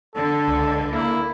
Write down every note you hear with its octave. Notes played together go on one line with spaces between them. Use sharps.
D3 A4
C#2
A#3 E4